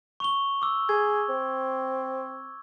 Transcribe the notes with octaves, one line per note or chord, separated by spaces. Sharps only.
C#6 F7 G7
D6 E6
G#4 G#6
C4